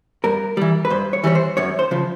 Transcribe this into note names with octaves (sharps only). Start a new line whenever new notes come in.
G2 A#4
E3 G3
B4
G2 C5
C#5
E3 G3 C#5
C5
F#2 C#5
C5
C#3 F3